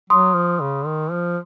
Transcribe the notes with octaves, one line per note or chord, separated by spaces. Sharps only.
F#3 C6 D#6
F3
C#3
D#3
F3